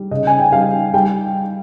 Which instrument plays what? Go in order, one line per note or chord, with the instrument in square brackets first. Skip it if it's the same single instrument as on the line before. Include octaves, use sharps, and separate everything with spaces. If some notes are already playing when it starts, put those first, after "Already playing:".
Already playing: [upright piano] G3
C#3 D#5
G#5
G5
G3 F5
G3 G5